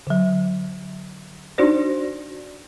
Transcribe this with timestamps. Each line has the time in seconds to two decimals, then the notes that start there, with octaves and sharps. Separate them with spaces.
0.07 D3 F#3
1.58 D4 D#4 F#4 C5 D5